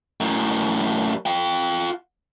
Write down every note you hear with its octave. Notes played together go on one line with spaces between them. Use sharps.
F#2 A2
F4 G5